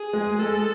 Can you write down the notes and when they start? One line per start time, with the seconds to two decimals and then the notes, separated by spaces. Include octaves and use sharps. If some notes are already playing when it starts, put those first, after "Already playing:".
Already playing: G#4
0.13 G#3
0.39 G#3 A4